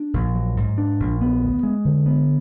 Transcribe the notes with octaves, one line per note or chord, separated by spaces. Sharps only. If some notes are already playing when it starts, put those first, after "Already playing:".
Already playing: D4
A#1
F#3
G#2
D4
A#1
B3
D2
G#3
D3
B3